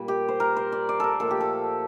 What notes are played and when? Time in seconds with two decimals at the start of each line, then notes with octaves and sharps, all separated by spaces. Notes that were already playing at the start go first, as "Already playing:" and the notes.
Already playing: A#2 G3
0.08 G4
0.29 C5
0.40 A#4
0.57 C5
0.72 D5
0.89 D5
1.00 A4 A#4
1.20 A#2 F3 A3 A4
1.31 G4
1.41 A4